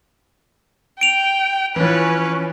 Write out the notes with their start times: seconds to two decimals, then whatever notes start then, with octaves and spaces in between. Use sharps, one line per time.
1.01 G5 D7 F7
1.76 E3 F3 C#4 B4